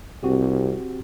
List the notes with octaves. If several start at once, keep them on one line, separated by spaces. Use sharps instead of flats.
C2 C4 F#4 G4